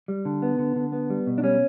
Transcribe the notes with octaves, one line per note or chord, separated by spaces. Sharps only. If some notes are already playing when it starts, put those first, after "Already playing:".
G3
D3
B3
D3
D3
B3
G3
B2
D4
G3 C#4